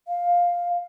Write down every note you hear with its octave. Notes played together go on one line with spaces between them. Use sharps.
F5